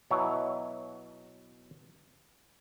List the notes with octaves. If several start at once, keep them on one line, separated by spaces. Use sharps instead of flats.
B2 F#3 E4 C#5